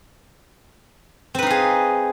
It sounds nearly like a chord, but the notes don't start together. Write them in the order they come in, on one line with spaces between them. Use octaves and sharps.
C4 B4 D#4 F5 G#4